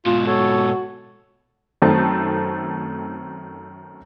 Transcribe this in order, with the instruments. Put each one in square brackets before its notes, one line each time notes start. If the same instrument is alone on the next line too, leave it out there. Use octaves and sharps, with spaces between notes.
[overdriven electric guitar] G#2 B2 [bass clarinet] F4
[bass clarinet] F#4 [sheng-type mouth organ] A4 C#5
[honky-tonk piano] F#2 D#3 A3 C4 A5